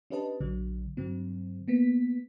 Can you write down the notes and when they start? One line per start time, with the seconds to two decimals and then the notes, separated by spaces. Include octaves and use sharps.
0.10 C#4 D4 G4 B4 D#5 A5
0.40 A#1 D3 F#3 D4
0.97 G2 D3 F#3 C4
1.68 A#3 B3 B6